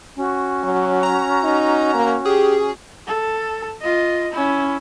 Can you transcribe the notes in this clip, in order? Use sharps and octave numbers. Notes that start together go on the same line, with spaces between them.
C#4 F#4
F#3
A#5
D#4
A#3
G4 G#4
A4
F4 D#5
C#4 E4